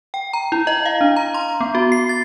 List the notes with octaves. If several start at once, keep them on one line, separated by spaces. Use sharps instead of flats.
G5
A#5
E4
D#5
F5
D4
A#5
C6
B3
F#4
C7
A6